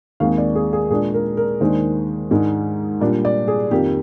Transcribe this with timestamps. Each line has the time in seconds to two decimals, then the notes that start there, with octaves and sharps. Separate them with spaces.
0.20 D#2 D#3 G#3 C4 F5
0.38 D5
0.55 G#4
0.73 G#4
0.90 A#2 G#3 D4 G#4
1.14 A#4
1.37 A#4
1.60 D#2 D#3 G#3 D4 C5
2.31 G#2 D#3 G#3 D4
3.01 A#2 G3 D4 D5
3.25 D5
3.48 G#4
3.71 F2 D#3 A#3 G4